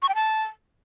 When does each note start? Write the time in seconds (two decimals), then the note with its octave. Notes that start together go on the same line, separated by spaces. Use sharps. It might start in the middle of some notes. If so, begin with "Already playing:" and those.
0.02 C#6
0.09 G5
0.15 A5